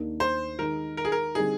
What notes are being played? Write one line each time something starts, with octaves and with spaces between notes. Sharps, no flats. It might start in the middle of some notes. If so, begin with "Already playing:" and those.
Already playing: D#2 D#3 A#3 D4
C5
D#3 G#3 D#4 A#4
A#4
G#4
A#4
D3 G3 C4 D#4 G#4